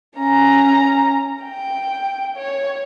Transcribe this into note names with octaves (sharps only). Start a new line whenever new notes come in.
C#4 A#5
G5
C#5